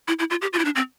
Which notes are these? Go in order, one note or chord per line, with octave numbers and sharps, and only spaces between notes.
E4
E4
F4
G4
F4
E4
D4
C4